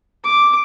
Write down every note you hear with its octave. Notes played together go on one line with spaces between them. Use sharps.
D6